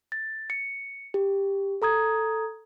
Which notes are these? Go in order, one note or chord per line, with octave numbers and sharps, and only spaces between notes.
A6
C#7
G4
A4 A#5 D#6 G#6